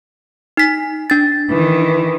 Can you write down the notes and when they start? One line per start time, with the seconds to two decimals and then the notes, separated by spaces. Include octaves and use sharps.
0.57 D#4 B6
1.10 D4 A6
1.50 D#3 E3